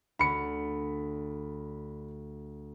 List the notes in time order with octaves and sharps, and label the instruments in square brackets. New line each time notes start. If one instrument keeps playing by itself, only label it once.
[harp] D2 [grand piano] B5 C#7